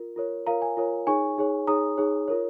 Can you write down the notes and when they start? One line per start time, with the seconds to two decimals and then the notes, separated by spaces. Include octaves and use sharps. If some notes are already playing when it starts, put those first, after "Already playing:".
Already playing: F4 A#4
0.16 F4 A#4 C#5
0.47 F4 A#4 C#5 F5 A#5
0.62 G#5
0.77 F4 A#4 C#5
1.07 D#4 G#4 C#5 G#5 C#6
1.38 D#4 G#4 C#5
1.67 D#4 G#4 C#5 A#5 D#6
1.98 D#4 G#4 C#5
2.28 F4 A#4 C#5